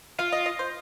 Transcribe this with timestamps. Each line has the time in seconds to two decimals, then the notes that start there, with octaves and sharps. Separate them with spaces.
0.19 F4 F5
0.32 D#5
0.46 D#5
0.59 C5